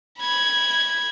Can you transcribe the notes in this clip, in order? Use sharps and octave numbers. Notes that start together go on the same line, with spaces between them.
B5 G#6